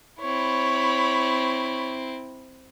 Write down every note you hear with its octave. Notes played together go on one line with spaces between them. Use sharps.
C4 E4 C#5 B5